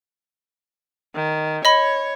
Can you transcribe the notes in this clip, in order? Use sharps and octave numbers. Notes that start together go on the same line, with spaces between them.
D#3
C#5 D#5 B5